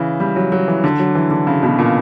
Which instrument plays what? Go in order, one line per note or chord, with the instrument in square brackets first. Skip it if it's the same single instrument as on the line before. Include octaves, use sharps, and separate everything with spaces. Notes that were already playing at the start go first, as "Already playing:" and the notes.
Already playing: [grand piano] C#3 E3
G3
F#3
F#3
E3
D3
F#3
E3
D3
C#3
B2
A#2